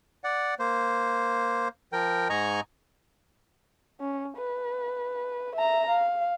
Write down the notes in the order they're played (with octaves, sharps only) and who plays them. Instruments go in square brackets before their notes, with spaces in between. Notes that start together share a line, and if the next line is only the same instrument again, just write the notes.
[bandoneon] D5 F#5
A#3 C5
F3 A#4 G5
G#2 D#5 G#5 A#5 C#6
[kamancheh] C#4
B4
E5 A#5
F5